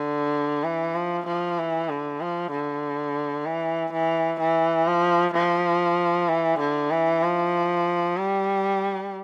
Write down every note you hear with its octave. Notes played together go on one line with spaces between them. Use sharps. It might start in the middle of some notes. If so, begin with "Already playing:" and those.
Already playing: D3
E3
F3
F3
E3
D3
F3
D3
E3
E3
E3
F3
F3
E3
D3
E3
F3
G3